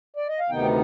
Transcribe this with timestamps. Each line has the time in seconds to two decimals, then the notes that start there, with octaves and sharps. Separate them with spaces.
0.16 D5
0.28 D#5
0.40 F5
0.49 D2 C3 D#3 B3 D#4 G5